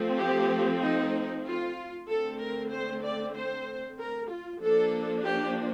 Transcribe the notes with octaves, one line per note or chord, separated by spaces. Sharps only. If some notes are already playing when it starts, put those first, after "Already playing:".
Already playing: F3 A3 C4
G4
D#4
F4
D3 A3 C4 A4
A#4
C5
D5
C5
A#4
F4
F3 A#3 D4 A4
G4